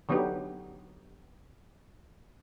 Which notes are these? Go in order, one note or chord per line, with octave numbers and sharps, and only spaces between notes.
D3 F#3 B3 D#4 G4